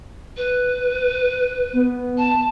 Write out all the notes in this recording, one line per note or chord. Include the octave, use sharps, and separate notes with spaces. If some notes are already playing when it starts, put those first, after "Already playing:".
B4
B3
A5